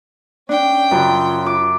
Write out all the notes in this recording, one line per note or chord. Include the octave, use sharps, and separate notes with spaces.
C#4 D4 G5
F#2 C#3 F4
D6